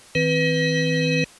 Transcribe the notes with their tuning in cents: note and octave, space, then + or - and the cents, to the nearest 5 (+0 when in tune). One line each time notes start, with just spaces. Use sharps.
D#3 +40 C4 +0 B4 +0